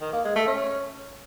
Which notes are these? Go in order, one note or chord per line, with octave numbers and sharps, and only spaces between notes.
D#3
A#3
G#3
A3
C#4